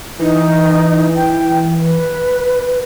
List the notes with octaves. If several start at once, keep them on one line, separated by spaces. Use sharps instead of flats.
E3 D#4
G5
B4